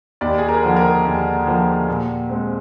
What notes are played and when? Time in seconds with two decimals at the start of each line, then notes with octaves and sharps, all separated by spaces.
0.21 D#2 D5
0.38 G#4
0.48 A#4
0.63 D3 F3 A#3
0.76 A#4
1.05 D#2
1.46 D3 F3 A#3
1.88 A#2
2.29 G#3 C4